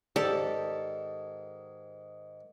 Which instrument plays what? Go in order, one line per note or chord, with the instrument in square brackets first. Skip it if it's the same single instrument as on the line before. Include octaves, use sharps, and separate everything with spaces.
[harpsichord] G#2 D#3 [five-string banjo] G4 D5 [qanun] A4